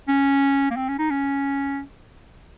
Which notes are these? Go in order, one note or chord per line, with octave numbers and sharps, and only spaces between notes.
C#4
A#3
C4
C#4
D#4
C#4